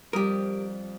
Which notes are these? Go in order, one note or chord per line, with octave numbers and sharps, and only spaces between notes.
F2 G3 G4 A#4 D#6